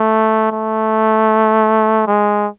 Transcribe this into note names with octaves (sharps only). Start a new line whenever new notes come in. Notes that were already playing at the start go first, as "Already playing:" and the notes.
Already playing: A3
A3
G#3